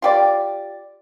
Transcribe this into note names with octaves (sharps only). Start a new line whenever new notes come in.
F4 G4 D5